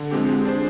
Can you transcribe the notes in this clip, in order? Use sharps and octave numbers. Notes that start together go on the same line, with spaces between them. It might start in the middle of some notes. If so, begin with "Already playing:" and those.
Already playing: D3
F3 G#3 C4 G4
G#3
D4 G#4 C5